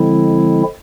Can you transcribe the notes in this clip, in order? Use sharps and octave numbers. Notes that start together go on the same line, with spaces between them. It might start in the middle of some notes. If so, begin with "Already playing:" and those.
Already playing: D3 F3 G#3 C4 E4